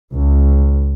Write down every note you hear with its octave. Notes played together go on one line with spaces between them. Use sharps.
C#2